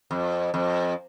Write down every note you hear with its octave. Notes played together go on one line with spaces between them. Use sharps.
F2
F2